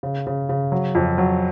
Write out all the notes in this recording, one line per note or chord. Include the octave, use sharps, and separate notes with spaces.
C#3
C#3
C#3
F#3
F2
F#3